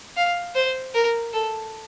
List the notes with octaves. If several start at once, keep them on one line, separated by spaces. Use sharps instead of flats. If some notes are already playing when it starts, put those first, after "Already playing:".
F5
C5
A#4
A4